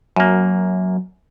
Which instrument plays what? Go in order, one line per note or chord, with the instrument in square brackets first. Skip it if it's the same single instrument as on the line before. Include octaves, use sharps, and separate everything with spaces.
[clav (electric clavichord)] F#2 A#3 [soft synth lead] F#3